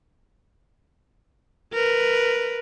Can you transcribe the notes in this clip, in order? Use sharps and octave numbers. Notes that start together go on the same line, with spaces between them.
A#4 B4